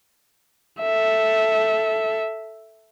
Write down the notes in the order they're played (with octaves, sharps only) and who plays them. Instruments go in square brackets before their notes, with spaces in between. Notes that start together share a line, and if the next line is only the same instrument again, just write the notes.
[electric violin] A4 E5